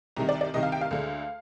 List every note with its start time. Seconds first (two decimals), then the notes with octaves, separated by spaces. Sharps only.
0.16 C2 C3 D#3 A#5
0.29 D5
0.41 D5
0.54 C2 C3 D#3 D#5
0.63 F5
0.72 G5
0.81 F5
0.91 D2 D3 G#3